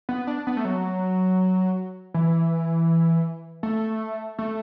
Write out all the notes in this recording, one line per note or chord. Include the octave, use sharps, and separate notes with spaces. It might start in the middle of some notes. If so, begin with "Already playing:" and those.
B3
D4
B3
A3
F#3
E3
A3
A3